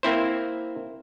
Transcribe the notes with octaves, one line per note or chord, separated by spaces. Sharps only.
A#3 C4 E4 C5